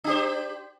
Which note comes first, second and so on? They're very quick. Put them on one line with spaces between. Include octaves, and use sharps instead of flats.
D4 G4 C5